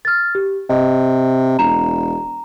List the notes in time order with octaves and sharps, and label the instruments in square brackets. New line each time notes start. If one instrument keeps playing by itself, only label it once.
[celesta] F6 A6
G4
[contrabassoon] C3 [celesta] D#5
[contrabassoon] E1 [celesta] A#5 E7